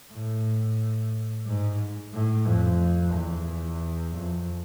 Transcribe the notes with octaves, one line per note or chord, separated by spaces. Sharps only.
A2
G#2
A2
F2
E2
F2